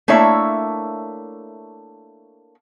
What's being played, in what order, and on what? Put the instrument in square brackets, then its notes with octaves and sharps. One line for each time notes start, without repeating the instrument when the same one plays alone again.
[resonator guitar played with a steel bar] A3 A#3 D4 E4 C#5 E5